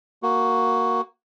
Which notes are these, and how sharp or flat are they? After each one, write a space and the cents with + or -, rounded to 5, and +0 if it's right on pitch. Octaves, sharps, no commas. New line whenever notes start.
A#3 +0 F#4 +0